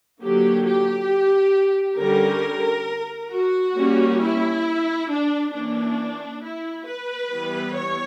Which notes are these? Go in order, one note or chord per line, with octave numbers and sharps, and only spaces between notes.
D3 F#3 A#3 G4
G4
D3 G3 C#4 A#4
F#4
G3 A#3 C#4
E4
D4
E3 A#3 C#4 D4
E4
B4
E3 G3 B3
C#5